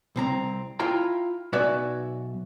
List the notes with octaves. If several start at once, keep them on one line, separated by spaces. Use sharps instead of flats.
C2 C4 A#5
E4 F4 G5 A#5
B1 F#4 B4 D5 E5 G#5